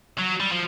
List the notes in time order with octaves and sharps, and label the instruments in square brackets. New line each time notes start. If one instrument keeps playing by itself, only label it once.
[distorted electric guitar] F#3
G3
F3